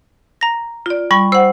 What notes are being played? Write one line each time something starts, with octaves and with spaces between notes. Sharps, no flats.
A#5 A#6
F4 D5
G3 B5 C#6
C5 F#5 E6